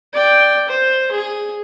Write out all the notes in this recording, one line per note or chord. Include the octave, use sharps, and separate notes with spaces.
D5 G5
C5
G#4